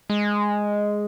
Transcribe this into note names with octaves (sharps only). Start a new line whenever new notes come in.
G#3